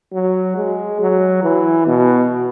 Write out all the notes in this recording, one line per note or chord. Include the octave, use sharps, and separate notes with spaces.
F#3
G#3
F#3
E3
B2